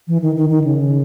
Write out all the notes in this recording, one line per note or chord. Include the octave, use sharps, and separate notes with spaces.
E3
D#3
D#3
D#3
C#3